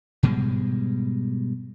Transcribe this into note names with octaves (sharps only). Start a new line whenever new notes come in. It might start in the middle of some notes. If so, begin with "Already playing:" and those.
G#2 B2 G3 G#3